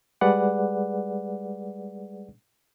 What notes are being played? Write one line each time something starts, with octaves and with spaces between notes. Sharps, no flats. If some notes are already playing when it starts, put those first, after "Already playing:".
G3 G#3 G#4 B4 D5 F#5